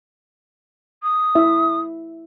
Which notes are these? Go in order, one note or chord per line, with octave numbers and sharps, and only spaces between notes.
D#6
E4 E5